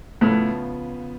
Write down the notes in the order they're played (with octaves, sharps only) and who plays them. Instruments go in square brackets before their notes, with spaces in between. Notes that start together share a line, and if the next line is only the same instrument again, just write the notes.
[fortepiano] A2 [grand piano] C#3 F3 B3